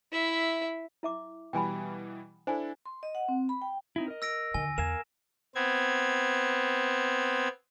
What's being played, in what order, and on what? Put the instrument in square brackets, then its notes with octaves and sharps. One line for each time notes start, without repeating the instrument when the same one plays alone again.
[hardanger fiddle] E4 E5
[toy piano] E4 E5 D6
[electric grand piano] B2 E3 G3 [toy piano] G5 G#5 B5
[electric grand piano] D4 E4 A4 [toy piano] C5 G#5
[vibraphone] C6
D#5
F#5
C4
B5
G5
[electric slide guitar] C4 D#4 E4
A#4 D#5
[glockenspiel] E6 A#6 D7
[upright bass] D#2 D3 [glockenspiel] G#5
[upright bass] E2 [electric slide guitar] A#4 F5 G#5 [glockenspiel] E7
[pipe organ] B3 C4 G#6